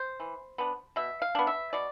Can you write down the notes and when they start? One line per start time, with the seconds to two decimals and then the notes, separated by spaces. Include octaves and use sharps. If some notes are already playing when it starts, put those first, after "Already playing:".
Already playing: C5
0.20 E3
0.58 B3 D4
0.96 B2 E5
1.22 F5
1.35 B3 D4
1.47 E5
1.73 B2 D5